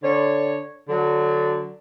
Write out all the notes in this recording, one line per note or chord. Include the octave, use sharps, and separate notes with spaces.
D3 C#5
D3 F#3